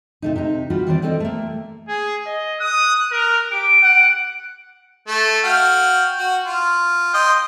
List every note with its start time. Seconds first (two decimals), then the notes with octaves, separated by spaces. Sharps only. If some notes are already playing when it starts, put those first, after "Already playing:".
0.22 C3 A3 D#4
0.36 C3 D#4
0.70 G3 F4 F#4 B4
0.87 D#3 E3 G3 C4 D5
1.02 G3 C4 A4 C5 C#5 D#5
1.20 A3 A#3
1.88 G#4
2.26 D#5
2.60 D#6 F#6
3.12 A#4
3.51 G4 D7
3.82 F#5
5.07 A3
5.44 F#4 F5 G5
6.18 F#4
6.46 F4
7.14 D#5 G5 C6